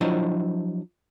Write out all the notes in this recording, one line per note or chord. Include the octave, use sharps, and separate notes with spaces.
F3 F#3 D4 E4 C5 D#5